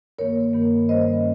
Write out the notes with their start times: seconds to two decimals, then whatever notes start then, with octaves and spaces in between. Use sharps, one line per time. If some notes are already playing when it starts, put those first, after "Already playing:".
0.19 G2 D#3 A#3 A#4 C#5
0.54 G2 D#3 A#3
0.89 G2 G3 C#4 C5 D#5